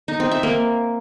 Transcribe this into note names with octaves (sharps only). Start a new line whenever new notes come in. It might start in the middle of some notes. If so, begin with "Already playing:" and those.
D#4
C4
E5
A#3